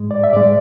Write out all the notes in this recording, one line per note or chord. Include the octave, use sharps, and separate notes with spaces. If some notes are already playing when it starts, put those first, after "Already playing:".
Already playing: G#2 G#3
D5
E5
G#2 G#3 D5